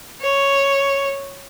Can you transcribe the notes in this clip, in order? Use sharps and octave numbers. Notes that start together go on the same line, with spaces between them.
C#5